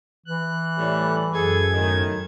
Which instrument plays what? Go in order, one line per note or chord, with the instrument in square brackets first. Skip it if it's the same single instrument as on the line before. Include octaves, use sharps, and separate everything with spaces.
[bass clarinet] E3 [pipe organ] F#6
[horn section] A2 G3
[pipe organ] F#2 G#6 [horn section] G#4 A4
[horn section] A2 D#3